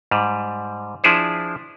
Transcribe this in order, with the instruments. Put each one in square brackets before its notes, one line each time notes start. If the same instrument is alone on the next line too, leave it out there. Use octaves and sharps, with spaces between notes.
[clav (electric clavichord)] G#2 G3
F3 D4 E4 G#4 C5